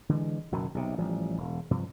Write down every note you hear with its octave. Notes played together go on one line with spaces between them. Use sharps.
D3 E3 G#3
F#1 F#2 B2 D#3
B1 C3
A1 F3 G3
E1
G2 C3 F3